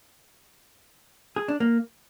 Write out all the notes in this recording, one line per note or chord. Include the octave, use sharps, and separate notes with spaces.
G#4
D4
A#3